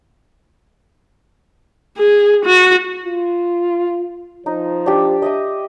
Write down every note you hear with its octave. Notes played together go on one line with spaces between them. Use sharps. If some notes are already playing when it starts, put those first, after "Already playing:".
G#4
F#4
F4
F3 D#4
D4 G4
D#5 E5 D#6